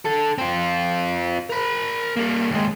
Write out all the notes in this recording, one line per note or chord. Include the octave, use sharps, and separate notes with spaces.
D3 A4
C4 F4
A#4 B5
G3 A#3
D#2 G#3